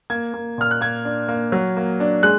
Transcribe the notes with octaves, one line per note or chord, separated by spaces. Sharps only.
A#3 G#6
A#3
A#2 F6
F#6
A#3 G#6
D4
A#3
F#3
A#3
D4
G#3 F#6